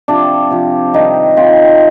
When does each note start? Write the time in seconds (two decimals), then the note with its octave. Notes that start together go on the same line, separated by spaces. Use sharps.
0.08 C3 F3 D4
0.51 C3 F3
0.94 C3 D#3 G3 D#4
1.37 C3 D#3 G3 F4